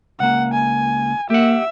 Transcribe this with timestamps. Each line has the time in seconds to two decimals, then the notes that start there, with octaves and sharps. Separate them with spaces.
0.20 C#2 A#3 F#5
0.54 G#5
1.30 A#3 G4 E5 F#5